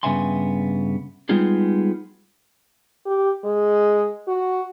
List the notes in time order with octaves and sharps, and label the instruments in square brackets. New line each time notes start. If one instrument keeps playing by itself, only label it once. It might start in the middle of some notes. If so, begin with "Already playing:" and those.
[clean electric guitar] G2 C#3 B3 E5 G#5 C6
G3 G#3 B3 D#4 F4 G#4
[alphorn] G4
G#3
F#4